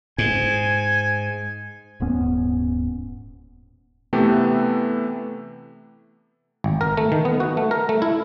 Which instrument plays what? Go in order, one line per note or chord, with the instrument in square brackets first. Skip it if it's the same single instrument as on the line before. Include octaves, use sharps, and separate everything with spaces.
[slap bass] G#2 [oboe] G#5
[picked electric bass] D#1 G#2 B3 C#4
[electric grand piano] C3 E3 A3 B3 G4 A4
[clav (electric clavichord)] G#1
A#4
A3
D#3
B3
F#4
A3
A#4
A3
E4